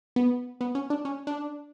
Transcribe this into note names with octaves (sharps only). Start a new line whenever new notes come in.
B3
B3
C#4
D4
C#4
D4